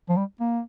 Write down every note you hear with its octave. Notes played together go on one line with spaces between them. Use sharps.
F3
G3
A#3